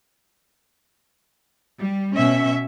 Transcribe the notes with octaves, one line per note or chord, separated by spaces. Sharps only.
G3
B2 C#4 E5